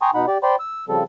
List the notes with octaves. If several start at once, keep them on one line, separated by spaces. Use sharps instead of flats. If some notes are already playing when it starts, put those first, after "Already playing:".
G5 G#5 A#5 C6 C#6 D#6
B2 D#4 F#5 B5
G4 D5
C5 D5 G5 B5 C6
E6
C#3 F3 G3 C4 A4